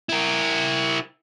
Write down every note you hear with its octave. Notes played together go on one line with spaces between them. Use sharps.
E4 A#4